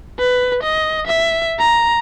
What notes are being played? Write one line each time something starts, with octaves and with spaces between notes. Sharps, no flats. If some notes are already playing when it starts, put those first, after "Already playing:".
B4
D#5
E5
A#5